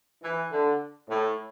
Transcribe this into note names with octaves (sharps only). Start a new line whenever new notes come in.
E3
D3
A2